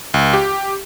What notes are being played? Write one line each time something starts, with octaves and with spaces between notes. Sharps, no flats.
C#2
G4